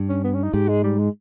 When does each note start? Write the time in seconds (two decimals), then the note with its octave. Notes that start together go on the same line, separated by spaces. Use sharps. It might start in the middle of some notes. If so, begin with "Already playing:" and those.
Already playing: G2
0.09 C#4
0.24 B3
0.34 C#4
0.43 D#4
0.53 G#2 G4
0.68 G#3
0.83 G3
0.99 G#3